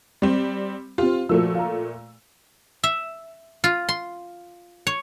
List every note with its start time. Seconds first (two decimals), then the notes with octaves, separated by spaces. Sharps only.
0.22 G3 C4
0.98 C4 F4 G4
1.29 A#2 F3 A3 F#4 A#4 E6
1.55 F5 A#5
2.83 E5
3.64 F4
3.89 C6
4.87 C#5